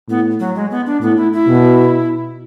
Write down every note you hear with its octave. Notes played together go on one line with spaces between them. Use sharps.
A2 B3
F#3
G#3
B3
D4
A2 B3
E4
E4
B2